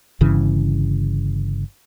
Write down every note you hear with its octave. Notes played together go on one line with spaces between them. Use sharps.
G1 G2 C#3 E3